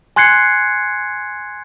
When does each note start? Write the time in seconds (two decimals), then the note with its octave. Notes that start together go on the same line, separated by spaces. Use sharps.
0.16 G#5 C6 F#6 G#6 C7 C#7